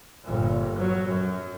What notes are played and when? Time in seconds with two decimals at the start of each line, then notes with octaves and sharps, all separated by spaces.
0.24 G1 A#2
0.77 F#3
1.08 F#2